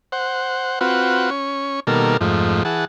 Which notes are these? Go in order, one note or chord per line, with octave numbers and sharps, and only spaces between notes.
C5 F#5
C4 F4 F#4 B4 F#5
C#4 C#6
B2 D#3 G3 A#3 A4 A#4
F2 G#2 F3 A3
E3 G#4 F#5 A5